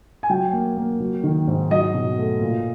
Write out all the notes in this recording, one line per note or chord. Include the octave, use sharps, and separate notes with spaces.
G#5
F#3 G5
A#3
A#3
F#3
D#3
G#2
F#3 D#5
B2
A3
A#2